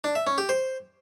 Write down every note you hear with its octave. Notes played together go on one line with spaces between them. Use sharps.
D4
E5
C#4
G4
C5